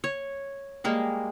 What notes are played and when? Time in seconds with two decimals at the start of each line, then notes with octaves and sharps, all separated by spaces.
0.04 C#5
0.84 G3 G#3 A#3